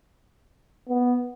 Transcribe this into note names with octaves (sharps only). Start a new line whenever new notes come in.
B3